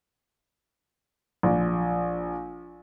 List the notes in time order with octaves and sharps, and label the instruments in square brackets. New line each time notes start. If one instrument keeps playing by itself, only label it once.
[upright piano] A#1